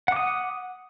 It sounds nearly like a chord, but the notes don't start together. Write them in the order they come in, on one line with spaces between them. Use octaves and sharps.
F#5 D6 D#6